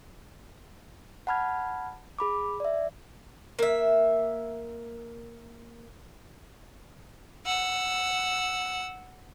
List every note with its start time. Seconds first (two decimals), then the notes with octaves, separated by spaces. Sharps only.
1.27 F#5 A5 B5 F6 G#6
2.19 G#4 B5 D6
2.60 D5 E5
3.59 A#3 E5
7.46 F#5 E6